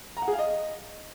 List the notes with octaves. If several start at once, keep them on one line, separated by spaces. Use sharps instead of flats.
A#5
F#5
G#4
F5
D#5